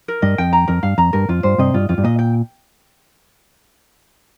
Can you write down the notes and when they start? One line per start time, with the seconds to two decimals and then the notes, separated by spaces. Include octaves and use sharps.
0.08 A#4
0.22 G2 D#5
0.38 F2 G5
0.53 A#5
0.68 F2 A#4
0.83 G2 F5
0.98 F2 A#5
1.13 G2 A#4
1.29 F2 F4
1.43 G2 C5
1.58 G2 C3 D#5
1.74 G2 F4
1.89 F2 F4
1.98 G2
2.04 A#2 D#5
2.19 G5